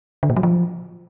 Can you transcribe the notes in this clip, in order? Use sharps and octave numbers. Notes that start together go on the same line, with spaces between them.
D3
A#2
F#3
F3